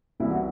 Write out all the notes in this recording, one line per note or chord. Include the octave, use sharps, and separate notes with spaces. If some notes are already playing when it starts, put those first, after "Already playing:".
C2 C3 E3 E4
F#4